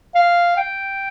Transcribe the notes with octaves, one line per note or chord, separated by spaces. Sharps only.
F5
G5